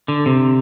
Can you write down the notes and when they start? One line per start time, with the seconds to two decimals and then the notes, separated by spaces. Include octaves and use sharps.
0.08 D3
0.26 C3